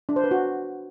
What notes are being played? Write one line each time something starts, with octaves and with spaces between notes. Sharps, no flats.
D4
C5
B4
F#4